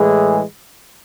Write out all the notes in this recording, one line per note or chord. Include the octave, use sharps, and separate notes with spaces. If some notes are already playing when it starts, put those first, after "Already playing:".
Already playing: A2 E3 G#3 G#4